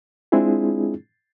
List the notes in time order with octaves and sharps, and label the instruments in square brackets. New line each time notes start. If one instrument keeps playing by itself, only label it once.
[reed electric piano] G#3 C4 D4 E4 F4 G#4